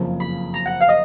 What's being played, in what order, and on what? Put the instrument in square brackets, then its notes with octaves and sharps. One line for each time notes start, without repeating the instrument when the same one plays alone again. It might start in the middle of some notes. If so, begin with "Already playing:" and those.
Already playing: [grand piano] F#1 F2 C#3 F3
[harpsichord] B5
A#5
F#5
F5
D#5